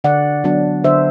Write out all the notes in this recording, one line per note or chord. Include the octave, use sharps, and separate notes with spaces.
D3 D5 F#5
F#3 B3 D4
D3 C5 E5